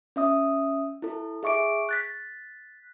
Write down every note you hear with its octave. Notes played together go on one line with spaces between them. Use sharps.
C#4 E5 D#6
E4 A4
G#4 E5 C#6 D6 D7
F#6 A6 B6